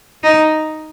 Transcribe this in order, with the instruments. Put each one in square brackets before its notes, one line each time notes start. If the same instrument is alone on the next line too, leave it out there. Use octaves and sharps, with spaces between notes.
[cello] D#4